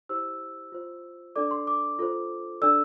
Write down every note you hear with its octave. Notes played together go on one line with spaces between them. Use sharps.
E4 G4 C5 E6
F4 C5
D4 A4 D5 D6
C6
D6
F4 A4 C5
D4 A4 D5 E6